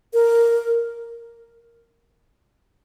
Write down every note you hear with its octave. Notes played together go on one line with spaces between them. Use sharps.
A#4